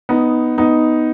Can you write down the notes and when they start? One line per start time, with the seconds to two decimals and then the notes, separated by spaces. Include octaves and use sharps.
0.09 B3 D#4
0.58 B3 D#4